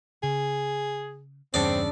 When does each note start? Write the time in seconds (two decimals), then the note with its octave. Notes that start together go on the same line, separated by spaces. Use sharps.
0.23 C#3 G#4
1.54 E2 G2 C#3 C4 D4 A4 D5